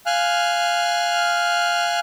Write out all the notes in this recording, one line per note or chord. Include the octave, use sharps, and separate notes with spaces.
F5 G#5 F6 F#6